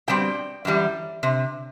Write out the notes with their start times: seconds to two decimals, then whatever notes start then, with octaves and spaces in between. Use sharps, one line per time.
0.08 B2 G3 C4 G5
0.65 F#2 E3 G3
1.23 C3